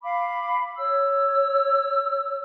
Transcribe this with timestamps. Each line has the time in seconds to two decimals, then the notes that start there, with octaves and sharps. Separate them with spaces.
0.03 F5 B5 D6
0.78 C#5 E6